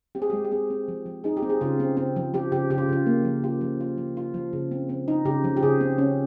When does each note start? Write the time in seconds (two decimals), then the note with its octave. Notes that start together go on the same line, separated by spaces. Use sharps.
0.15 C4 G4
0.22 G#4
0.30 G#3 G4
0.45 G4
0.52 C4 G#4
0.70 C4
0.88 F3
1.06 F3
1.24 D#4 G#4
1.37 G4
1.42 C4
1.49 G#4
1.61 C#3 F4
1.80 C4
1.97 C4
2.16 F3
2.34 F3 G4
2.52 C#3 G4
2.70 C#3 G4
2.78 F4
2.89 C#3 F4
3.06 A#3
3.25 F3
3.44 F4 G4
3.61 F3
3.81 F4
3.98 F3
4.17 F4
4.34 F3
4.53 C#3
4.71 C4
4.89 C4
5.08 D#4
5.25 C#3 G4
5.44 F3
5.57 G4
5.63 C#3 G#4
5.81 C4
5.98 C#4